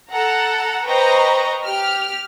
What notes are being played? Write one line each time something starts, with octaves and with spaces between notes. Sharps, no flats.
A4 F#5 A#5
B4 C5 D#5 G5 A#5 C#6
G4 F6